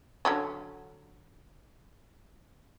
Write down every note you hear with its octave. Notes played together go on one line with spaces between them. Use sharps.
D3 F#3 C#4